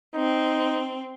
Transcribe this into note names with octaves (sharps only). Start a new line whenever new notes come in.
C4 D#4